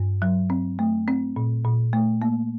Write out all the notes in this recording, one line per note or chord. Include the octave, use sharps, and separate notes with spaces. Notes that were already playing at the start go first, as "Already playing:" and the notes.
Already playing: G2
F#3
C4
A3
C4
A#2
A#2
A3
A#3